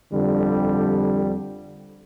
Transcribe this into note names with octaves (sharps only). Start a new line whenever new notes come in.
F2 D3 G3